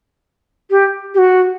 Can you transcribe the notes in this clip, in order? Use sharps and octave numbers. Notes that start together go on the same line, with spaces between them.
G4
G4
F#4